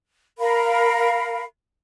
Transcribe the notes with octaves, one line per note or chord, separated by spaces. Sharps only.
A#4 F5 B5